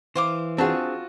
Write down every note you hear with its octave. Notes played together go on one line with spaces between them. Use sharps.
E3 C5 F5 D6
C4 D4 F4 F#4 G#4 A5